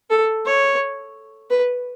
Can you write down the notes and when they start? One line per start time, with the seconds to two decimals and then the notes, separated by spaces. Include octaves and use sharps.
0.10 A4
0.45 C#5
1.50 B4